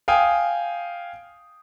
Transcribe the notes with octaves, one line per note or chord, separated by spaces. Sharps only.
F5 G5 G#5 D#6